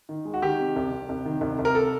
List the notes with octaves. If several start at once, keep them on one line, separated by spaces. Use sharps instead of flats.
D#3
G#3
F#4
D#3 G4
C3
C2
C2
C2
D#3
C2
C2
A#4
A4